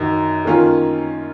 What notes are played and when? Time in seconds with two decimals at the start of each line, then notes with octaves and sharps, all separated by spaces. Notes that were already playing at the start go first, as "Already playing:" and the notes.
Already playing: F#2 D#3 F#3
0.45 D#3 A#3 C#4 F4